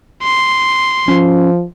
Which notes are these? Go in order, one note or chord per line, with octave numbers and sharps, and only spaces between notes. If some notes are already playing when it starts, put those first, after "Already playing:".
C6
F3 C#4